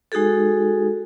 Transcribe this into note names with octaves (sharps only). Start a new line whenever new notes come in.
G#3 D#4 F#4 G#4 A4